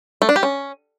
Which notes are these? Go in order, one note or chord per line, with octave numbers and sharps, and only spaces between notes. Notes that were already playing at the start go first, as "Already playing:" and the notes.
A3
D4
G4
C#4